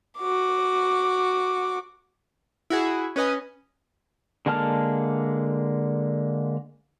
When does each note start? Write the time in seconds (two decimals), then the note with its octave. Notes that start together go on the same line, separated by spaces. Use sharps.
0.18 F#4 D6
2.70 E4 F#4 G#4
3.16 C#4 B4 D#5 G#5
4.46 D3 G#3 A#3 A5 F6